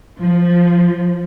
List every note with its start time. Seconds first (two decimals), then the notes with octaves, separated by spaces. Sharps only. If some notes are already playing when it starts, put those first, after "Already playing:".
0.20 F3